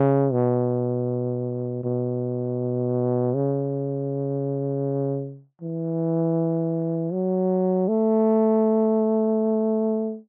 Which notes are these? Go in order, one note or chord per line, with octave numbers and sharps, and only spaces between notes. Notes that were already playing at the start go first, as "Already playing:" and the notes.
Already playing: C#3
B2
B2
C#3
E3
F#3
A3